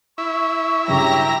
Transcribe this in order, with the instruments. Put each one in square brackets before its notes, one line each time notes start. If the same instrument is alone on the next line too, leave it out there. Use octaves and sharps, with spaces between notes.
[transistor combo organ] E4 [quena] C#6
[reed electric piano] G2 C#3 F#3 [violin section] G4 A#5 A#6